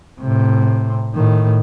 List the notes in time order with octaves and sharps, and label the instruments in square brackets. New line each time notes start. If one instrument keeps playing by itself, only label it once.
[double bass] A2 C3
A2 D#3